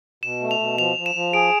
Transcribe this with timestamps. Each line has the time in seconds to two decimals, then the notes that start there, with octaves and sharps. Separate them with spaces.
0.23 B2 E7
0.41 A3
0.51 F7
0.59 B2
0.78 F3 F7
0.97 F3
1.06 E7
1.15 F3
1.33 G#4 D7